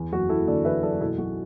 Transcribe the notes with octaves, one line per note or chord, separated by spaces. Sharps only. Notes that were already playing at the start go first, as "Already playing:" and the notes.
Already playing: E2
F#1 F#4
F#1 E4 A4
D3 A4 D5
E2 B4 E5
F#1 A4 D5
B2 E4 A4
B1 F#4